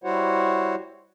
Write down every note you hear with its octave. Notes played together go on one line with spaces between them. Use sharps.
G3 E4 F#4 C5 C#5 F#5